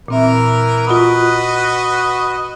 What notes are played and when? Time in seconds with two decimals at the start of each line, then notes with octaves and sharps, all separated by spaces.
0.08 A#2 E3 C4 A#4 E5
0.87 F4 F#4 B4 D#5 D#6